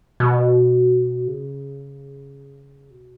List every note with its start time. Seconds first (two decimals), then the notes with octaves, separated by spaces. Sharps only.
0.20 B2
1.28 C#3
2.90 B2